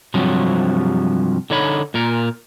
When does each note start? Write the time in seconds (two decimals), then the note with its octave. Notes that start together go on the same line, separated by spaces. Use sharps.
0.14 G2 C3 F3 F#3
1.50 D3 D#4 C#5 B5
1.94 A#2 A#4